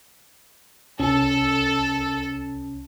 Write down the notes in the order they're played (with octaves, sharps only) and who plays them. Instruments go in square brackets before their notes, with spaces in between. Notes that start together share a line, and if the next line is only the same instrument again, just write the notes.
[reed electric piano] C2 C#4 [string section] A4